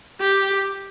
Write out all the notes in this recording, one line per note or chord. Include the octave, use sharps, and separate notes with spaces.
G4